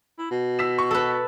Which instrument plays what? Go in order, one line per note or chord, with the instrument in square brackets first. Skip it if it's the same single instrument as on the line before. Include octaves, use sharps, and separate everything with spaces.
[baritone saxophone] E4
B2
[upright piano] E6 B6 E7
C#6
[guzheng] A4 B4